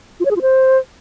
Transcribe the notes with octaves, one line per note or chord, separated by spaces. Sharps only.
F4
C#5
G#4
F4
C5